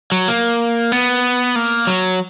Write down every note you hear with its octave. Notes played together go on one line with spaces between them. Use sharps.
F#3
A#3
B3
A#3
F#3